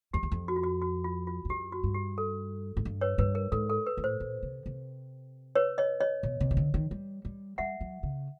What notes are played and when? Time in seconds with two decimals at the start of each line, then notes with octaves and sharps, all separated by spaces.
0.13 F2 G4
0.23 E2
0.32 F2
0.48 F#4
0.56 F4
0.64 F#4
0.82 F#4
1.04 F4
1.27 F4
1.45 F2
1.49 F#2 G4
1.72 F#4
1.83 G2
1.95 G4
2.18 A4
2.77 G#2
2.85 G2
3.01 B4 C#5
3.18 G2 B4
3.35 A#4
3.52 G#2 A4
3.70 A4
3.86 B4
3.97 A2
4.04 C5
4.20 A#2
4.43 C3
4.66 C3
5.55 B4 C#5
5.78 C#5 D#5
6.00 C#5 D#5
6.23 B2
6.40 C3
6.51 C#3
6.57 D3
6.74 D#3
6.91 G3
7.25 G3
7.58 G3 E5 F#5
7.81 F#3
8.03 C#3